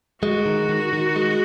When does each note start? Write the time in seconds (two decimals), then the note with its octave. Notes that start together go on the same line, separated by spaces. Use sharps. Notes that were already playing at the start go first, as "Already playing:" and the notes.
0.23 G#3 F#4
0.46 D#3
0.69 D#3
0.93 D#3
1.16 G#3